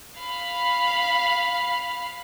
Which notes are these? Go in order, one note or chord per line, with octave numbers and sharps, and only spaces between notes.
F5 B5